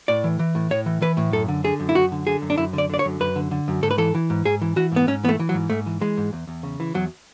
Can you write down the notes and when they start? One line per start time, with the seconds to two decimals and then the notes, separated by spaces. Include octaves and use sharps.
0.08 A2 D5
0.24 E3
0.39 E3
0.55 A2
0.71 A2 C#5
0.86 E3
1.02 E3 B4
1.17 A2
1.33 F#2 A4
1.48 D3
1.64 D3 G#4
1.80 F#2
1.89 E4
1.95 F#2 F#4
2.12 D3
2.27 D3 G#4
2.42 F#2
2.50 D4
2.58 F#2 E4
2.73 D3
2.78 D5
2.90 D3 D5
2.99 C#5
3.05 F#2
3.20 F#2 B4
3.36 D3
3.51 D3
3.68 F#2
3.83 G#2 A4
3.91 B4
3.98 E3 A4
4.15 E3
4.30 G#2
4.45 G#2 G#4
4.62 E3
4.76 E3 F#4
4.92 G#2 B3
5.07 G#2 C#4
5.24 E3 B3
5.29 A3
5.40 E3
5.49 F#3
5.54 G#2
5.70 G#2 A3
5.86 E3
6.01 E3 G#3
6.17 G#2
6.33 E2
6.48 E2
6.63 C#3
6.80 E3
6.94 E2 F#3